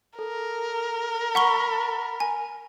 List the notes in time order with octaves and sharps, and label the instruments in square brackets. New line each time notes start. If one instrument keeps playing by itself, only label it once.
[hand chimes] A4 [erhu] A#4
[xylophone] F#5 C#6 G7 [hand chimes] A#5 B5 B6
[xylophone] G#5